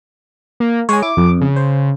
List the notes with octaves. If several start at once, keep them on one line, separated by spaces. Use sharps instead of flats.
A#3
G#3 C#5 G#5
E4 D6
F2
C#3
C5